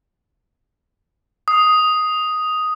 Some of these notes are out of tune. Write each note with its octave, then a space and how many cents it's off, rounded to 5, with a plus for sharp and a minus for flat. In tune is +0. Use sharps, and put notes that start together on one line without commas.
D#6 +5